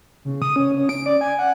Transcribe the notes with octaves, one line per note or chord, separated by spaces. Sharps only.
C#3
D#6
C#4
C#4
D7
D5
G#5
F#5